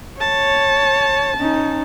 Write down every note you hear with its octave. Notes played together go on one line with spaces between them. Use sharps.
C#5 A5
C#4 D#4